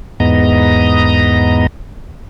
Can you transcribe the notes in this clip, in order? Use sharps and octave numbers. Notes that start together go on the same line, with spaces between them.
E2 G#2 B3 D#5 A#5